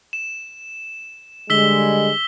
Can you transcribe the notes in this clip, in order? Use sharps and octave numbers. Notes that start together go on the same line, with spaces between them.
E7
D3 G3 G#3 E6 B6 G7